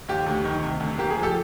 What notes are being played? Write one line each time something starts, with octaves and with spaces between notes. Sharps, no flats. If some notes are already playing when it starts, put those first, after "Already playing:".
D#2 G4
D2
D#3
C3
D2
A#3 G4
G#4
F3
G4 A4